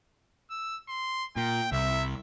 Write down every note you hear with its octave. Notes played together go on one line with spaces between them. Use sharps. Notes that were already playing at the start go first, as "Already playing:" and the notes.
E6
C6
A#2 G5
C2 E5